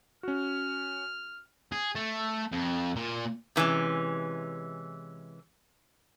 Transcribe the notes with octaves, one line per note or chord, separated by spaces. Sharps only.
C#4 F#4 F6
G#4
A3
F2
A#2
C3 E3 G#3 C#4